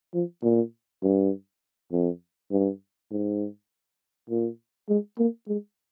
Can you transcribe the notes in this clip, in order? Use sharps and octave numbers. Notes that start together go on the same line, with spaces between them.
F3
A#2
G2
F2
G2
G#2
A#2
G#3
A#3
G#3